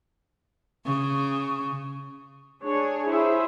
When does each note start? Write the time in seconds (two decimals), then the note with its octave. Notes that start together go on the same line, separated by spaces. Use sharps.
0.86 C#3 C#6
2.65 D4 G#4 C#5
3.09 E4 G#4 C5 E5